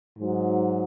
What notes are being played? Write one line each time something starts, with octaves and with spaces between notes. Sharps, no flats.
G#2 F#3